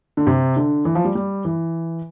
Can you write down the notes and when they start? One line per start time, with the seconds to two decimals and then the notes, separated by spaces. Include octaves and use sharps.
0.17 D3
0.27 C3
0.56 D3
0.85 E3
0.95 F3
1.05 G3
1.15 G3
1.45 E3